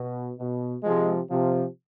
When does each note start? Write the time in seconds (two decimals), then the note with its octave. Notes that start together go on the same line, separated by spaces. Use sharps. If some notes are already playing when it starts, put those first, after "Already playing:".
Already playing: B2
0.38 B2
0.84 C3 F3 G#3
1.29 C3 F3